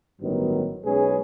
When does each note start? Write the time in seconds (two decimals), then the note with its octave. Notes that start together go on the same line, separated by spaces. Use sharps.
0.21 A1 G2 D#3 F#3 B3
0.85 B1 G#3 C#4 G#4 B4